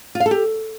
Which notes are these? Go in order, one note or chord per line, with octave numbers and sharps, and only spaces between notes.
F4
F5
A4
G4